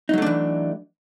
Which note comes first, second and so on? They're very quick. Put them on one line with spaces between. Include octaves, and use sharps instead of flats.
D#4 F#3 A3 D4 E3